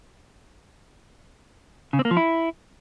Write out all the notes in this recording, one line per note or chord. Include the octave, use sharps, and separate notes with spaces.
C#3
C4
A#3
F3
E4